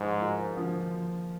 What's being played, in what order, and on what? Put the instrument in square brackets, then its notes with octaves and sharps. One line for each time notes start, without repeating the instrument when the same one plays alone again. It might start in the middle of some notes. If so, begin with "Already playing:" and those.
Already playing: [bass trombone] G#2 [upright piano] F3
[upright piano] A#3 F4 G#4
F3